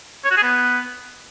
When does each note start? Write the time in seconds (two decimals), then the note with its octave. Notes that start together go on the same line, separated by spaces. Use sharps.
0.24 C#5
0.31 F#4
0.37 G#4
0.43 B3